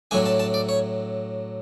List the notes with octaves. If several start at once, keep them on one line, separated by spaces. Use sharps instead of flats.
A2 F#3 A3 D4 G#5
A5
A5
D5
C#5